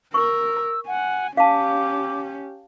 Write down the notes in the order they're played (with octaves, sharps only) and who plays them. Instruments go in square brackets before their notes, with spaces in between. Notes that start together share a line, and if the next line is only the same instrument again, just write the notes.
[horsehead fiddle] A#4 [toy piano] C#6 [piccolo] E6
[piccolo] F#5 [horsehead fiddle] G#5
[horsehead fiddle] C#4 G4 [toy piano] F5 A5 [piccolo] D6